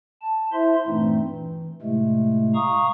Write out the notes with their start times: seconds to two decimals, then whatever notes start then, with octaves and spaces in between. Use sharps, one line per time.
0.22 A5
0.53 E4 C5 E5 C6
0.87 G2 A#2 E3 A3 C4 D#4
1.28 E3
1.82 A2 C3 G#3 A3
2.55 F5 A#5 C#6 D#6